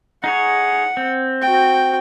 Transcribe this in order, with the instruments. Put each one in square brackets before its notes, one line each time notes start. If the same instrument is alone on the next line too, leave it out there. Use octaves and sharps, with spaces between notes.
[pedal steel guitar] D#4 G#4 C#5 [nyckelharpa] F#5
[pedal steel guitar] C4
[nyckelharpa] F#4 G5